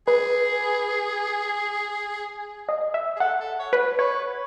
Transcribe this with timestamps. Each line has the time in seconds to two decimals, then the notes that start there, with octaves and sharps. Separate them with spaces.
0.08 G#4 B4
2.69 D#5
2.94 E5
3.16 G#4
3.20 A4 F#5
3.40 A4
3.59 C#5
3.73 B4
3.98 B4 C#5